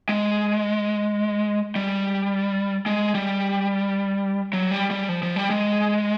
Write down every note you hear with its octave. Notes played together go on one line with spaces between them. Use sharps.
G#3
G3
G#3
G3
F#3
G3
G3
F3
F3
G3
G#3